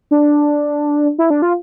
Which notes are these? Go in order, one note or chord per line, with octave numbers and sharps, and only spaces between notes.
D4
E4
D4
F4